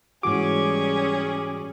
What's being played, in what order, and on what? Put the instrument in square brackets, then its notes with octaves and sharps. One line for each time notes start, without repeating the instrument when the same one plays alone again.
[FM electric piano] G#2 E3 F#4 [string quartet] G3 C#4 G#4 [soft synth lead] D6